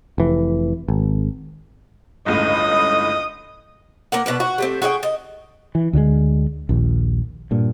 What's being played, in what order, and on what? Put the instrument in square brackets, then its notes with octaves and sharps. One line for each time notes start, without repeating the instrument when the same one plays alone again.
[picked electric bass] F1 E3
G#1
[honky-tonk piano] G1 C#2 A2 [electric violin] D#5 D#6
[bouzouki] A#3 A#4 F#5
B2 D4 B4
F#4
G3 A3 C4
F#4 G#4 D#5 G5
D#5
[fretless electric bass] E3
D2 D3 D#3 G#3
A#1 D#2
G2 A#2